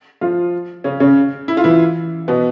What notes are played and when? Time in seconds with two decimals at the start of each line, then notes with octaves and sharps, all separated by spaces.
0.21 F3 F4
0.84 C#3 C#4
1.00 C#3 C#4
1.48 E4
1.57 F4
1.64 E3 E4
2.28 B2 B3